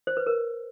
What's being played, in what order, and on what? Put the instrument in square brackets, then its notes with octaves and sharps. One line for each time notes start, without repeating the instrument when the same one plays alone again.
[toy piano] C5
B4
A#4